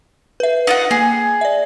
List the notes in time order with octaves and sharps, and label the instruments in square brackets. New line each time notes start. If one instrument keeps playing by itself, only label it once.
[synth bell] B4 E5
[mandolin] D#4 F4 F#5
[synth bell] A#3 [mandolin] G#4
[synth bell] D5 E5